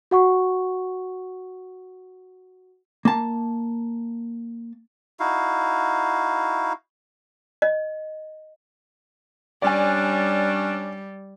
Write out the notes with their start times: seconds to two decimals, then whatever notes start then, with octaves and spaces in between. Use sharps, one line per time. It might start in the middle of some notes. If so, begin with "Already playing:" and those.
0.11 F#4 F#5 C#6
3.05 A#3 A5
5.20 D#4 E4 F#4 F5
7.62 D#5
9.62 G3 C#4 D4 D5 G#5